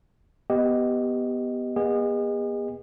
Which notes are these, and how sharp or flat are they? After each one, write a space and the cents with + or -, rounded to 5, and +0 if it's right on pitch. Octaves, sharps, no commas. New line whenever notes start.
B3 +0 G4 +0 D#5 +0
B3 -35 G#4 -40 D#5 -10